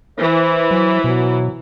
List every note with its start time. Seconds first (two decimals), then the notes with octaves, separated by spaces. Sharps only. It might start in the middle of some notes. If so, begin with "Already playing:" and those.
0.18 E3 C5
0.71 F#3
1.04 B2 F#3